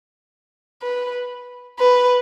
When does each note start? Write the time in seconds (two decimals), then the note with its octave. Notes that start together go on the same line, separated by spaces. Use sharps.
0.82 B4
1.79 B4